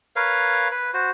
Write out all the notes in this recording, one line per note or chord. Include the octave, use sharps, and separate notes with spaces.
A#4 B4 C#5 F5
B4
F#4 C5